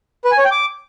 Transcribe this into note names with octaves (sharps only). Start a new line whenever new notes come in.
B4
G#5
C#5
G5
D6